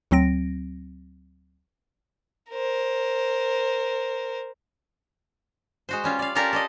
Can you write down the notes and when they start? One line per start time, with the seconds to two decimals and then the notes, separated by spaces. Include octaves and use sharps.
0.11 D2 F#3 C4 A#6 D7
2.51 A#4 C5
5.89 G#3 F#4 C5
6.04 G3 C#4 F4
6.19 D5 F5
6.35 C#4 F4 G4 A4 A#4 D5
6.53 A4 D5 D#5